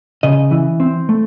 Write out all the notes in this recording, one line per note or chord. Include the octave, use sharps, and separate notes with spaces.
C#3 D#5
E3
C4
A3